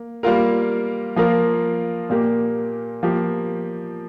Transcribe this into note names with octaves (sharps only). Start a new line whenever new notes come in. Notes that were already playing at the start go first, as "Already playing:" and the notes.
Already playing: A#3
G3 A#3 F4 A#4
F3 A#3 F4 A#4
A#2 A#3 G4 A#4
F3 A#3 G4